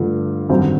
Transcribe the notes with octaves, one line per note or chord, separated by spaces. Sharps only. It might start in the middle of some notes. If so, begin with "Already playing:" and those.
Already playing: G2 D3 F3 A3
G#1 F#2 D3 G3 C4